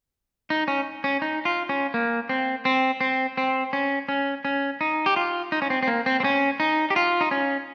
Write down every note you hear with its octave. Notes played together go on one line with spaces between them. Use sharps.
D#4
C#4
C#4
D#4
F4
C#4
A#3
C4
C4
C4
C4
C#4
C#4
C#4
D#4
G4
F4
D#4
C#4
C4
C4
A#3
C4
C4
C#4
D#4
G4
F4
D#4
C#4